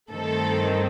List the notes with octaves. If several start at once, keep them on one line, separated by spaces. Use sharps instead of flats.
G2 D#3 A3 C4 A4